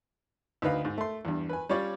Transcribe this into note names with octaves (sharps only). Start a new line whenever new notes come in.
D2 D#4 B4 F5
G#2
A3 C6
E2 G2
B4 G#5
G3 C#4 F4 C#5 D5